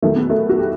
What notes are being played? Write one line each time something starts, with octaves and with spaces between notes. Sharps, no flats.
E2 D#3 F#3 A3
B3
A3
F#4
G4